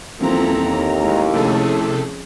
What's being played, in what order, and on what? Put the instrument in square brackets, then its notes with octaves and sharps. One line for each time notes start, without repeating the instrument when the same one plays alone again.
[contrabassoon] D#1 [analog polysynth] E2 A#5 [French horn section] F3 [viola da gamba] C4 E4 A4
[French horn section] D#2
[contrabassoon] A2 [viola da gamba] G#3
[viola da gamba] F2 C#4 G#4 [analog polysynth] C3 A3 A4